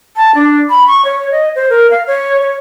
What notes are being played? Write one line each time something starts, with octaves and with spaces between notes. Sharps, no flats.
A5
D4
B5
C#6
C#5
D#5
C5
A#4
F5
C#5
C#5